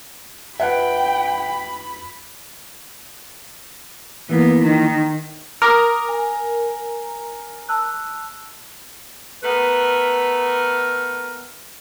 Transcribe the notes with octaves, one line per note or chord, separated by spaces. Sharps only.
F2 B4 E5 F#5 G5 B5 F#6
E3 A#3 B3
D#3
A#4 D6 D#6
G#5
A5 E6 F#6
A3 B3 A#4 B4